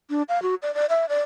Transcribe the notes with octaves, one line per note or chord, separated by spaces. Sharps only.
D4
F5
F#4
D5
D5
E5
D5